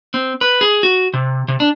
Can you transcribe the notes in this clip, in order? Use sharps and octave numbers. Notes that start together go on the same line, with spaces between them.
C4
B4
G#4
F#4
C3
C3
D4